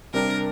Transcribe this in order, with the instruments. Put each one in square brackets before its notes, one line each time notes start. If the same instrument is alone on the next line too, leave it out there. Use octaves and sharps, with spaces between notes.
[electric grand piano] C3 G3 D4 [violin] A#4